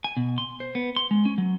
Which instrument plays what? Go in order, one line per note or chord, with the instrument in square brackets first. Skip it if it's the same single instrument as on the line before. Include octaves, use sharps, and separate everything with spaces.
[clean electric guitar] G#5
B2
C6
C5
B3
C6
G#3
C#4
F#3